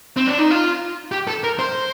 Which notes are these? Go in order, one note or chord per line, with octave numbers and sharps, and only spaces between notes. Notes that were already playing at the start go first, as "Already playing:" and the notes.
C4
D4
D#4
F4
G4
A4
A#4
C5